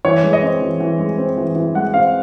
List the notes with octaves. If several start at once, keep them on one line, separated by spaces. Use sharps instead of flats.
E3 C#5
G#3
D#5
C4
E3
E3
G#3
C4
E3
E3
G#3 F#5
C4 F5